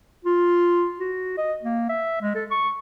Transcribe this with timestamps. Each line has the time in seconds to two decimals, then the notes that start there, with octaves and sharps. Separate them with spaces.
0.25 F4
1.00 F#4
1.38 D#5
1.63 A#3
1.89 E5
2.22 G#3
2.35 A4
2.51 C#6